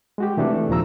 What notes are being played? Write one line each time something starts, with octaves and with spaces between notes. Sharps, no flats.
G#3 F#4 G4
C3 E3 A3 D4 A4
D#2 A#2 F3 A#5 E6